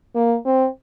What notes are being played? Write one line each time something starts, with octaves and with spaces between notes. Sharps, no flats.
A#3
C4